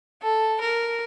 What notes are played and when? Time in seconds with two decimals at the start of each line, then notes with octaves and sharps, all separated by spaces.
0.24 A4
0.61 A#4